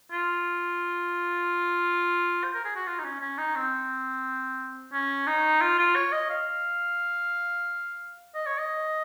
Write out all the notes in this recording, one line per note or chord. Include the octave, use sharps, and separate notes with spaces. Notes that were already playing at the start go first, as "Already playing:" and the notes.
F4
C5
A#4
G#4
F#4
F4
D#4
C#4
C#4
D#4
C4
C#4
D#4
F4
F4
C#5
D#5
F5
D#5
C#5
D#5